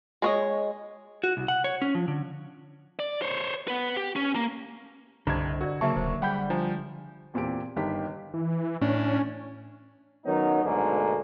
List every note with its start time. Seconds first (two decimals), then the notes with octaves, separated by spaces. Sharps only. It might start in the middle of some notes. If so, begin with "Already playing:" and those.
0.22 G#3 C#5 D#5
1.24 F#4
1.37 C2
1.48 F#5
1.64 C#5
1.82 C#4
1.95 F3
2.08 D3
2.99 D5
3.22 C5 C#5
3.68 B3 B4
3.96 G4
4.16 C#4
4.35 A#3
5.27 C2 G2 D3 C5 D#5 A#5 G#6
5.61 F#4 A#4 D5
5.81 C#3 F#3 A#3 E5 A5 C#6
5.96 D#1 C5
6.22 G3 G#4 F#5 G5 B5 G6
6.50 F3 D4 C5 A#5
7.34 E2 A#2 C4 G4 D7
7.76 G1 D#3 G4 B6
8.34 E3
8.81 A2 C#4 D4
10.26 D#3 F#3 B3 C#4 D#4
10.64 D2 G#2 B2 D3 A3 A#3